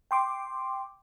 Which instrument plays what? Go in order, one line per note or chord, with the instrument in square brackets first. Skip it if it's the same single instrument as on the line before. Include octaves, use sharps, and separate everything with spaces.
[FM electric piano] G5 C6 D6